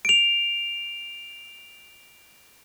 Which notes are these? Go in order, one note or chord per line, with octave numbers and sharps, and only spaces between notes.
D7 F7